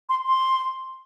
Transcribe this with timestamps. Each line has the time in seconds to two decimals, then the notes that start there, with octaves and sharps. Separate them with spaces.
0.09 C6
0.26 C6